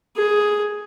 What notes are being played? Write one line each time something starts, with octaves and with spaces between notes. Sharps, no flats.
G#4